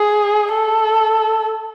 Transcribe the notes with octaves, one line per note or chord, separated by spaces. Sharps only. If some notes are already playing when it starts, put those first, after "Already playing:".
Already playing: G#4
A4